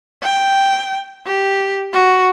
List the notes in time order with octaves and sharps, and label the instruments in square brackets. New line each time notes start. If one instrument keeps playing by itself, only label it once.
[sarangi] G5
G4
F#4